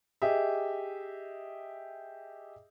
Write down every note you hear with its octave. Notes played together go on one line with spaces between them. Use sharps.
G4 G#4 D#5 E5